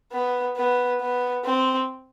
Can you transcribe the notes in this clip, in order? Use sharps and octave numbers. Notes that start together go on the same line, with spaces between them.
B3
B3
B3
C4